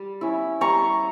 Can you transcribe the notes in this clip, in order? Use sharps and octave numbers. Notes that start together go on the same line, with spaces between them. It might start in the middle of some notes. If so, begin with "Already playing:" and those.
Already playing: G3
C#4 E4
G3 A#5 C#6